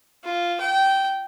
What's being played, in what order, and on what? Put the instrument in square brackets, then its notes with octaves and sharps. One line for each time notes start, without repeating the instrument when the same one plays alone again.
[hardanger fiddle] F4
G5